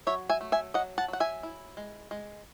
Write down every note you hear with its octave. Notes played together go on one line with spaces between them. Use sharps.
F#3 C#5 E5
E5 G#5
A3
E5 G#5
F#3 D#5 F#5
F#5 A5
F#3 F#5
E5 G#5
E4
G#3
G#3